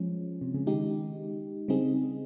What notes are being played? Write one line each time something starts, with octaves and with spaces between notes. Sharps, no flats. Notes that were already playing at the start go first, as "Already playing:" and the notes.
Already playing: F3 G#3 C#4
C3
C#3
D#3 G#3 D#4 G4
C#3 G3 C4 D#4 G#4